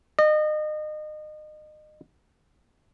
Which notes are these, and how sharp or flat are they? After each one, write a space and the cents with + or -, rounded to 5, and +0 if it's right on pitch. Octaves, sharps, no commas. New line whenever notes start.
D#5 -30